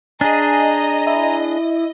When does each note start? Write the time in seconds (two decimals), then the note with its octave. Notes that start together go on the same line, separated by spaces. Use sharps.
0.21 D4 G#4 D#5 G#5 A#5
1.07 E4